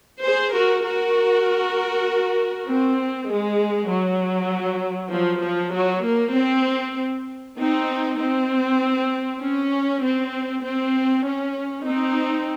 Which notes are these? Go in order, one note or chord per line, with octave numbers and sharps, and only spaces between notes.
G#4 C5
F#4 A#4
F#4 A#4
C4
G#3
F#3
F3
F3
F#3
A#3
C4
C4 D#4
C4
C#4
C4
C4
C#4
C4 D#4